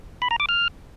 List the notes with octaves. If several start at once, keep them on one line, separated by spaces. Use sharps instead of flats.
B5
A#5
D6
F6